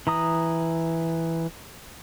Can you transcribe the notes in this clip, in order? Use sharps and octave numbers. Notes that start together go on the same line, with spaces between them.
E3 A#5 D#6